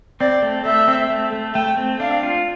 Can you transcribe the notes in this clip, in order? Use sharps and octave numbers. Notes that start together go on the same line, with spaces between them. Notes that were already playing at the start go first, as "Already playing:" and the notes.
C4 D5
A3
A3 E5
C4
A3
A3
A3 G5
C4
D4 F5
F4